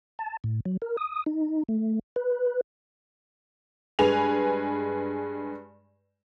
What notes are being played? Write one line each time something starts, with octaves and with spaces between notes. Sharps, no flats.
A5
A2
F#3
A#4
D#6
D#4
A3
B4
G2 G#3 B4 G#5 F7